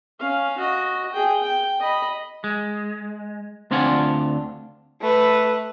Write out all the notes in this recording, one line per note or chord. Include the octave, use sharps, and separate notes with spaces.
C#4 F5
F#4 D#5
G#4 G5
G5
D#5 B5
G#3
D2 C4 D4 F4 F#5 G#5
A3 B4